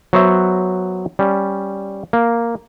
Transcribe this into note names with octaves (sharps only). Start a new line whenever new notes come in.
F#3 B3 F#4 C5 E5
G3 C#4
A#3